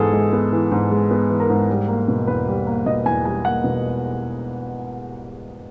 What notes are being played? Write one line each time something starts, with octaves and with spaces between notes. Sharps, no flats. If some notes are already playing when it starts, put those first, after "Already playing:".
Already playing: G#2 E3 G#3 B3 G#4 A4
G#3
B3
E3
G#2
G#3
B3
E3
A#4
G#2
G3
A#3
B2
E2 B4
G3
A#3
B2 D#5
E2 G#5
G3 G#5
A#3 F#5
B2